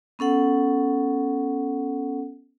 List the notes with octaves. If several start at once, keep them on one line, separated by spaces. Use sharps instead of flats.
B3 C#4 A4 F#5